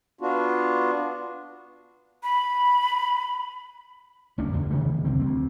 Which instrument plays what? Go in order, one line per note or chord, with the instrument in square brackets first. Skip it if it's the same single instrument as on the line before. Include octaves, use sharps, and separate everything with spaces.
[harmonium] B3 D4 F4 F#4
[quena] B5
[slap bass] F#1 D2 C#4 D4
A1 E2 D3
C3 D#3 E3 A3
C2 F2 D3 C4
D2 A3 C4